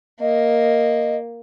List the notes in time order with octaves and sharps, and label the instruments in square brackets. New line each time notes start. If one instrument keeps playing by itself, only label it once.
[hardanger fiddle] A#3 [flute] D#5